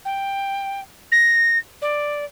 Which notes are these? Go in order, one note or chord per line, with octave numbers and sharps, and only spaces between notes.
G5
A#6
D5